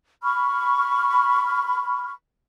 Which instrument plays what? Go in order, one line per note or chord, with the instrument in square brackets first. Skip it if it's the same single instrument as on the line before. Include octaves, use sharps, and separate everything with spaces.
[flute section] B5 C#6 F6